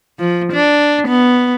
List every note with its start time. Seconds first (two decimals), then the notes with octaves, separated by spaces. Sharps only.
0.19 F3
0.53 D4
1.08 B3